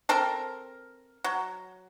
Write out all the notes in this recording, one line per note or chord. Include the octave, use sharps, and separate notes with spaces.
C4 A4 A#4
F#3